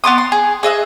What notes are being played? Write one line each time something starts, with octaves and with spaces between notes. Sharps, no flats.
B3 D5 C6 D#6
C6
G#4
G#4 D#5 E5 F#6